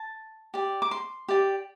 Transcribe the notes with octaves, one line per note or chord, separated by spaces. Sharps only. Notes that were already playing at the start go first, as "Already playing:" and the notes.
Already playing: A5
G4 D5
D6
C6
G4 D5